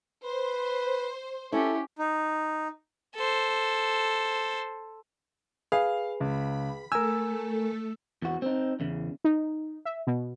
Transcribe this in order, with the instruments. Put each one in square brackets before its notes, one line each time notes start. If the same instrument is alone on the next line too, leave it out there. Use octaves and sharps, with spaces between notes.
[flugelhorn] B4 [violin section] C5
[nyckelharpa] C#4 G4 [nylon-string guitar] E4 F#5 [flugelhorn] A4
[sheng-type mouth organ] D#4
[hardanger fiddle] A4 C5
[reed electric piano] G#4 B4 [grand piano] F5
[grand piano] C#2 [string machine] B5
[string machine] A3 A4 [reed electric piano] A#4 G#5 [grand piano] E6
[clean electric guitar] E2 F#4
C4 D#4
E2 C#3
[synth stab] D#4
E5
B2